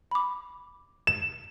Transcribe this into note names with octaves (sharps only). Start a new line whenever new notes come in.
B5 D6
E7